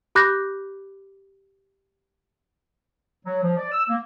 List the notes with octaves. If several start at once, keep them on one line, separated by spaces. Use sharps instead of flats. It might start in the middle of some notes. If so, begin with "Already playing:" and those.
G4 B5 D6 F#6 G6 A#6
F#3
F3
D5
E6
A#3